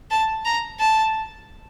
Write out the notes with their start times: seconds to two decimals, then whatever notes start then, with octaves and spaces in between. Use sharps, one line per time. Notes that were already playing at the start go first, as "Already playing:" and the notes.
0.11 A5
0.45 A#5
0.80 A5